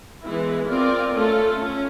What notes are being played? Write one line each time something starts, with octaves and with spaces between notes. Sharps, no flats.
E3 G#3 B3 E4
C4 F4 A#4 D5
A3 C#4 F4 A4
C#4